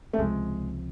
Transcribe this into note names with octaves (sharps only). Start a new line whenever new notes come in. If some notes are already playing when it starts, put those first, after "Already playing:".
A3
C#2 C3 F3 G#3